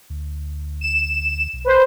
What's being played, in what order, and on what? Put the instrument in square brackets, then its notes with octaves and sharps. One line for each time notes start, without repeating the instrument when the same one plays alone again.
[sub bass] D2
[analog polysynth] E7
[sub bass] B1
[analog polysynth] B4 C5